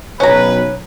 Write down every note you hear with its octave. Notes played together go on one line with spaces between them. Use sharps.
B1 C#4 B4 A#5